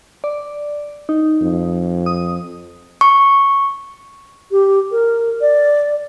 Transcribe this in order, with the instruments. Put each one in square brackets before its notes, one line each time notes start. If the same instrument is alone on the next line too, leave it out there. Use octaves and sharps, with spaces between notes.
[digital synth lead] D5
D#4
[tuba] F2
[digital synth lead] D#6
[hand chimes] C#6
[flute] G4
A#4
D5